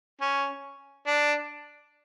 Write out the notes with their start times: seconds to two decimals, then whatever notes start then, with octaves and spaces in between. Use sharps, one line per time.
0.21 C#4
1.07 D4